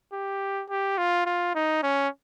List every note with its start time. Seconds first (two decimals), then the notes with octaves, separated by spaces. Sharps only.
0.13 G4
0.70 G4
0.98 F4
1.26 F4
1.55 D#4
1.83 C#4